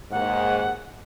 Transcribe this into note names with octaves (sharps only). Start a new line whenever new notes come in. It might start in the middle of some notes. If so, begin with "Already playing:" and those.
D#2 G#2 F#5